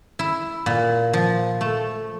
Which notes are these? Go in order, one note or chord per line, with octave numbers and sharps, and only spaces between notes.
E4
A#2
F3
A3